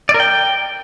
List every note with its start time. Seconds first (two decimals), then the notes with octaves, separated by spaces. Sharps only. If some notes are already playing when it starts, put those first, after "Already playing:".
0.09 D5
0.14 A#4
0.20 G5